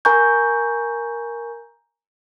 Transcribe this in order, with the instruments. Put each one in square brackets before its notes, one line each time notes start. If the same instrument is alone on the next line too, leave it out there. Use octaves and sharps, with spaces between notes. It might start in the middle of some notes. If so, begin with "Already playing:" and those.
[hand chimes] A#4 G#5 A#5 C#6 G6